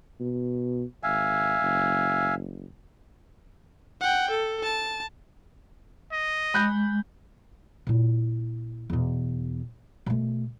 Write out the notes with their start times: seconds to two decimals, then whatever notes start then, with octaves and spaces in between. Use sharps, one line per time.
0.20 B2
1.03 G#1 E5 F5 G#5
1.62 F#1
4.01 F#5 G5
4.31 A4
4.63 A5
6.12 D#5
6.54 G#3 B5 F#6 G6
7.87 A#2 E4
8.90 E2 B2
10.06 B2 A3